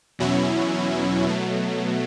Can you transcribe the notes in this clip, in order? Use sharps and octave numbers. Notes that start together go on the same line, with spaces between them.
E2 B2 F#3 C#4 E4
B2 F#3 A3